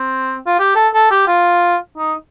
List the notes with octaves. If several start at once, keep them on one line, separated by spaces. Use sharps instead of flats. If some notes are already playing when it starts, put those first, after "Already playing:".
Already playing: C4
F4
G4
A4
A4
G4
F4
D#4